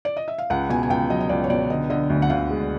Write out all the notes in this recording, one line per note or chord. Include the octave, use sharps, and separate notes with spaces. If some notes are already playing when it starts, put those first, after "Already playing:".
D5
D#5
E5
F5
C#2 F#5
B2 G#5
G#5
C#2 G5
F#3 D#5
D#5
C#2 D5
C#5
B2 D5
D3 D#5
D3 D#5
D2
F#5
D2 F5
G#3